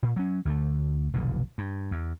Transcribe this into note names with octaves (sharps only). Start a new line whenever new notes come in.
A#2
F#3 C#4
D2 D3 E3 A3
F1 B1 A#2 D3
G2
E2